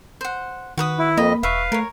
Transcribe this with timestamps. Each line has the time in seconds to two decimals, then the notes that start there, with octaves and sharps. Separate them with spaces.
0.21 C5 F#5
0.78 D#3 F#4 B4 D#6
0.99 E4
1.17 F2 A#3 D#5 B5
1.43 E1 B4 E5 F5 C#6
1.72 A3 A#4 C#5